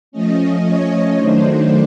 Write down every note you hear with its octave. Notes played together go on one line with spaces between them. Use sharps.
F3 A3 C#4 D#5
C#5
D#3 F#3 A3 D4 C5